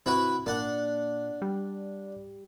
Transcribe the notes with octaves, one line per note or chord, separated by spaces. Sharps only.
C3 E4 F#4 B4
A#2 D4 F#5
G3